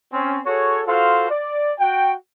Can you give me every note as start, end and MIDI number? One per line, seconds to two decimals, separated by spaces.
0.12 0.39 60
0.12 0.39 61
0.46 0.81 66
0.46 0.81 68
0.46 0.81 69
0.46 0.81 73
0.86 1.27 65
0.86 1.27 66
0.86 1.27 69
0.86 1.27 72
0.86 1.27 77
1.30 1.73 74
1.79 2.13 66
1.79 2.13 79